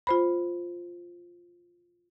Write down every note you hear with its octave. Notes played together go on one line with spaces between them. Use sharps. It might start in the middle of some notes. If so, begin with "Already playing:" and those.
F4 C5 B5